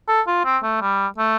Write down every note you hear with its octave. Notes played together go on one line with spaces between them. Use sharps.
A4
F4
C4
A3
G3
A3